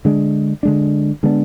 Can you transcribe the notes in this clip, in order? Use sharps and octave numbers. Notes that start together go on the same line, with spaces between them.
D3 G#3 D4
D3 G#3 D4
D3 G#3 B3 D4